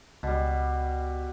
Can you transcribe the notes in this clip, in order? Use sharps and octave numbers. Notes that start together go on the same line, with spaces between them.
C#2 B2 G3